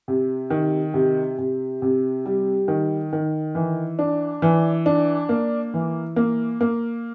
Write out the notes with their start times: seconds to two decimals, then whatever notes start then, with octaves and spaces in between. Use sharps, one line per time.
0.08 C3
0.50 D#3
0.94 C3
1.38 C3
1.82 C3
2.26 G3
2.68 D#3
3.13 D#3
3.55 E3
3.99 D4
4.42 E3
4.86 D4
5.29 A#3
5.74 E3
6.16 A#3
6.61 A#3